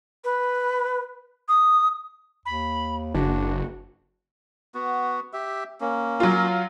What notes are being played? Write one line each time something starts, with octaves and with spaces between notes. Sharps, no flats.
B4
D#6
D#2 B5
F#1 D4 F#4
B3 F#4
G4 E5
A#3 C#4
F#3 F4